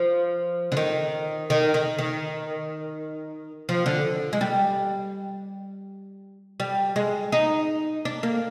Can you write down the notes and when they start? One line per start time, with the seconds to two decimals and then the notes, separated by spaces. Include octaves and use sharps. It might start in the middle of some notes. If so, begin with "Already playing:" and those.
Already playing: F3
0.72 D3
0.77 D#3
1.50 D#3
1.74 D#3
1.99 D#3
3.69 F3
3.86 D3
4.33 G#3
4.41 G3
6.60 G3
6.96 G#3
7.32 D#4
8.05 D4
8.23 A#3